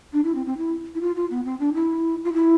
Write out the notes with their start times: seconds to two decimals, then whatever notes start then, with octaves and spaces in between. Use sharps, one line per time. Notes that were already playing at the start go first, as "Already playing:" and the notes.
0.13 D4
0.24 E4
0.35 C4
0.46 C4
0.57 E4
0.95 E4
1.01 F4
1.15 F4
1.31 B3
1.45 C4
1.60 D4
1.74 E4
2.25 F4
2.33 E4